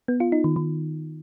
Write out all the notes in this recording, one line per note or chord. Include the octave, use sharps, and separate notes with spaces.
B3
F4
D#4
D#3
D#3